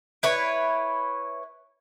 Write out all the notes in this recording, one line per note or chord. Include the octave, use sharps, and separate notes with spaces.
E4 B4 C#5